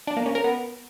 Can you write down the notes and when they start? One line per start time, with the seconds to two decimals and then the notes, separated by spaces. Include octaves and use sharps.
0.07 D4
0.17 A#3
0.26 C#4
0.35 A#4
0.44 B3